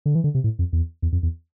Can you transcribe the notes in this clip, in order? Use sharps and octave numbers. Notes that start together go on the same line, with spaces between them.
D3
E3
D3
C3
A2
F2
E2
E2
F2
E2